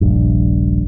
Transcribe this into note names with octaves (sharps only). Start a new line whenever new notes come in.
D#1 A#1 G2